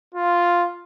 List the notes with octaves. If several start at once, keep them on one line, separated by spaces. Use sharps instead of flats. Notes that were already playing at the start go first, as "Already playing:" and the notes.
F4